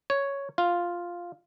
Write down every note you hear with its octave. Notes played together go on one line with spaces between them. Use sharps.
C#5
F4